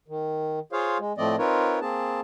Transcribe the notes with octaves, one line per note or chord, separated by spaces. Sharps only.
D#3
F4 G#4 C5 C#5 F5
G#3
A2 F3 A3 C4 D5 D#5
C4 D#4 F4 A#4 B4 C#5
A#3 C4 G#4 A5